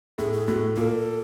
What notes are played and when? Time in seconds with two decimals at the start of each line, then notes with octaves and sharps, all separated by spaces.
0.18 A2 A3 G#4
0.33 G#4
0.47 A2 A3 F#4
0.76 A#2 A#3 A4